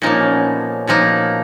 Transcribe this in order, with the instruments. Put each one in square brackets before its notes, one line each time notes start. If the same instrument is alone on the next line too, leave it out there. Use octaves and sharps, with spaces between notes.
[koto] A#2 F3 A#3 D#4 [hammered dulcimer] C#4
[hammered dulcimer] D4
C#4
B3
A3
[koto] A#2 F3 A#3 D#4 [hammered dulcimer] F#3